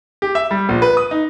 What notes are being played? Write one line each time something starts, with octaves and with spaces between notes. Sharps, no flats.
G4
E5
G3
A#1
B4
D#6
D#4